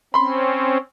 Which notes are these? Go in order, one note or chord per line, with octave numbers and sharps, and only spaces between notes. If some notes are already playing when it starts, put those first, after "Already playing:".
C4 C#4 B5 C6